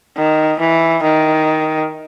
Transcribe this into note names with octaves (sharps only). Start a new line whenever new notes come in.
D#3
E3
D#3